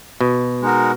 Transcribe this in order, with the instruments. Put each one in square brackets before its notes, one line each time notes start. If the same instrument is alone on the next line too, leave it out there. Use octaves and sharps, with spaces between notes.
[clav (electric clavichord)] B2
[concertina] G#3 D#4 F#4 A#4